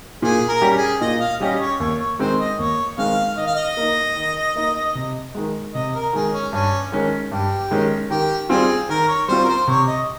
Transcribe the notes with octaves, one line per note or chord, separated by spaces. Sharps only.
A#2 G#4
A#4
G3 C#4 G4
G#4
A#2 D#5
F5
G3 C#4 G4 D#5
C#5
D#2 C#5
C#5
D#3 G#3 C4 C5
D#5
D#2 C#5
D#3 G#3 C4 F5
D#3 D#5
F5
D#5
A#3 D#4
D#3
A#3 D#4
C3
D#3 G#3
C3 D#5
A#4
D#3 G#3 G#4
C#4
G2 C#4
D#3 G#3 C#4
G2 G4
D#3 G#3 C#4
D#3 G4
G3 C4 F4 G#4
D#3 A#4
C#5
G3 C4 F4 C5
A#4
C5
C3 C#5
D#5